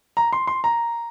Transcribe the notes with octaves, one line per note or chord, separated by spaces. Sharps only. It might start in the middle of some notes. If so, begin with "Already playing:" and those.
A#5
C6
C6
A#5